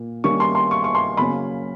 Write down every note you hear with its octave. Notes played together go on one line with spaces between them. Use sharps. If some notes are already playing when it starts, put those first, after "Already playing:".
Already playing: A#2
D#3 G3 A#3 C#4 C#6
C6
C6
C#6
C#6
C6
C#3 F#3 A#3 C#4 B5